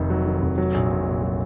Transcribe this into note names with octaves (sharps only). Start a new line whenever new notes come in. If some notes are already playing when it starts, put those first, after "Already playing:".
Already playing: F1 F2 D#3
F#3
D#3
F1
F#3
A#1
A#2
A#1
F#3